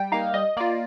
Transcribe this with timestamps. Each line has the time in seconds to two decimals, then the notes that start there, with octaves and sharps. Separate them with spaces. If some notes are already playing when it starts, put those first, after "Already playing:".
Already playing: G3 G5
0.12 A#3 D#4 F5
0.34 G3 D#5
0.57 A#3 F4 D5